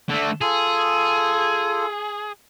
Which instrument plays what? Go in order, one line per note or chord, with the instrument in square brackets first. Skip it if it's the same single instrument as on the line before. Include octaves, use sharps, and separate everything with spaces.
[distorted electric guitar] D3 A3 [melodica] D4 A4
[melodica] F4 A4 [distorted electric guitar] G#4